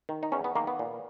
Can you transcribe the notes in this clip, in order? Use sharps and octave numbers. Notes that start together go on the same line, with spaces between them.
D#3
D#4
E2 C#4
B3
D#3 A#3
B3
A#2